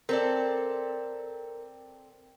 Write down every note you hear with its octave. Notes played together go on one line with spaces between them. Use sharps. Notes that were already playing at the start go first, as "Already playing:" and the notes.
C4 A4 A#4 D5